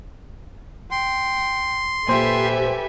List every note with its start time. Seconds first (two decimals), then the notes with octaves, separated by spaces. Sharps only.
0.91 G5 C6
2.09 A#2 G4 A4 B4 C5 E5 G#5